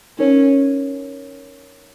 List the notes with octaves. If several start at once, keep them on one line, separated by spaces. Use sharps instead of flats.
C#4 D#4 A#4 C#5